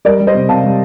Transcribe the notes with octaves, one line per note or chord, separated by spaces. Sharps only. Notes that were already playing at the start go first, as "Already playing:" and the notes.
G3 A#4 D5
G3
C5 D#5
C3
C3 F5 A5
G3